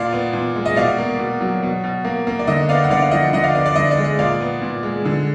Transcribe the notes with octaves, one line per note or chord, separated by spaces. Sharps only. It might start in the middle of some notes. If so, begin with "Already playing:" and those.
Already playing: A#2 D5 F5
B3
A#2
G#3
D#5
B2 D5 F5
A#3
B2
F#3
B2
B2
A#3
A#3
D5
D3 D#5
B3 D5 F5
F#5
D3 D5 F5
F5
F3 D#5 F#5
D3 D#5 F#5
D5 F5
B3 D5
D5
D3 D#5
D5
G#3
D#5
A#2 D5 F5
B3
A#2
G#3
D3